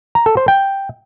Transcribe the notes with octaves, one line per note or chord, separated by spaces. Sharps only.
A#5
A4
C5
G5